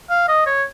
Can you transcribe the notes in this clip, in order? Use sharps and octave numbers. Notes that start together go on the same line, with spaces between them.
F5
D#5
C#5